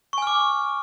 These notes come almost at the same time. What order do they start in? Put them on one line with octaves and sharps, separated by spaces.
C#6 G#5 F6 D6